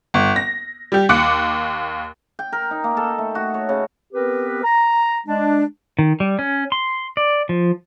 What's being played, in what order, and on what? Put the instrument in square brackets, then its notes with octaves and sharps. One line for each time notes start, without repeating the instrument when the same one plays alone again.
[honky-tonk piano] G1
A#6
G3 G4
D#2 D6 F#6 C#7
[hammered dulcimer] G5
A#4
D#4
A#3
A4
A3
F#4
C#5
C#3
[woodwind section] B3 C4 G4 A#4 B4
A#5
G#3 D4
[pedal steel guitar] D#3
G3
C#4
C6
D5
F3